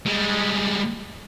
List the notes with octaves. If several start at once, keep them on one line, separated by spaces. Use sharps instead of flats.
G3 G#3